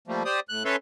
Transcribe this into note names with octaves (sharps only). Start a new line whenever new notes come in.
F3 G3 A3 A#3
G4 C5 D5 D#6
A2 F#6
C#4 A4 B4 C#5 E5 C6